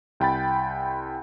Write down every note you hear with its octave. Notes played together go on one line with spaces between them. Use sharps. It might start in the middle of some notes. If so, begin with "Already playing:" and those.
C2 G5 B5 A6